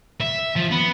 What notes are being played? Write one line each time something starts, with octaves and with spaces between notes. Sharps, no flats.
E5
F3
B3